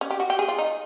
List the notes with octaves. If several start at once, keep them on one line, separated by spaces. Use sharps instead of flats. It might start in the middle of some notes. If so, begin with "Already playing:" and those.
C#4
G4
F#4
G4
G#4
F4
D#4